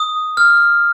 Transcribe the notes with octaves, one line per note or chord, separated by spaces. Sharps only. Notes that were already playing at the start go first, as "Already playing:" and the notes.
Already playing: D#6
F6